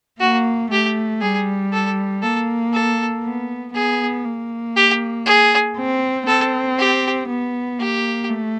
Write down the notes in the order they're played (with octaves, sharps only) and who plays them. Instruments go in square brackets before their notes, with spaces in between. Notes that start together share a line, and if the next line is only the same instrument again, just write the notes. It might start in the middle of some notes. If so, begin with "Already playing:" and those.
[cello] A#3 [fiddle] F#4
[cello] A3 [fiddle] G4
[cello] G3 [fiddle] G#4
[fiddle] A4
[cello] A#3 [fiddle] A4
[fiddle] A4
[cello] B3
[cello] B3 [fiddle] G#4
[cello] A#3
[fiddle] G4
G#4
[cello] C4
[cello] C4 [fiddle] A4
[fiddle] G4
[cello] B3
[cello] A#3 [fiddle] G4
[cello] A3